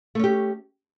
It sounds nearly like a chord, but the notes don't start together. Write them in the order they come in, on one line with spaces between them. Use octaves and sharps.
A3 C#4 G4